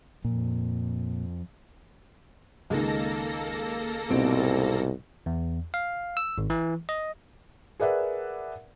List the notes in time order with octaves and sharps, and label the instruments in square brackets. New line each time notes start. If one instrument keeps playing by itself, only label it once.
[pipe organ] F2 [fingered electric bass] A#2
[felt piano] C#2 D#3 [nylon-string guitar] G#3 [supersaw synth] A#3 A4 A#6
[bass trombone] C2 [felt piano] G#2 B2 [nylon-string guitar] C4
[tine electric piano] E2
F5
E6
G#1
E3
D#5
[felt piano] G#4 A#4 B4 D5 E5 F#5